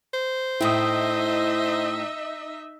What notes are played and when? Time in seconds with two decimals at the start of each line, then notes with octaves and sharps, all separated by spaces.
0.14 C5
0.61 A2 D#4 E4 D#5 E5 G5 D#6